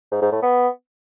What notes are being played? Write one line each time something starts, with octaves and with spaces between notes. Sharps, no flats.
G#2
G#2
A2
B3